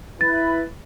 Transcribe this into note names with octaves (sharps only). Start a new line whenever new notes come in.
E4 B4 A6